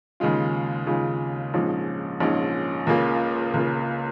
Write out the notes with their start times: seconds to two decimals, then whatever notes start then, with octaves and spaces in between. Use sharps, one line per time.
0.20 D#2 C#3 G#3 F4
0.86 D#2 C#3 G#3 F4
1.54 A#1 G#2 F3 G#3 C#4
2.20 A#1 G#2 F3 G#3 C#4
2.87 C#2 C#3 A#3 F4
3.54 C#2 C#3 A#3 F4